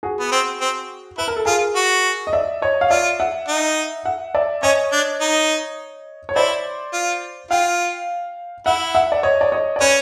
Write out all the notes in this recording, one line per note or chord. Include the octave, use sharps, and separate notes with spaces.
F#4 G#4
B3
C4
C4
E4 B4
A#4
A4
F4 G#4 A#4
F#4
D#5
D5 E5
C#5 D#5
F5
F4 D5 E5
E5 F#5
D#4
E5 F#5
D5 E5
C#4 C#5 D#5
D4
D#4
C#5
E4 C5 D5
F4
F4 F5 G5
E4 E5 F#5
E5 F#5
D5
C#5 D#5
D5
C#5 D#5
D5
C#4 B4 C#5